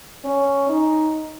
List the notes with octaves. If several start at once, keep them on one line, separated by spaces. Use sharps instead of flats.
C#4
D#4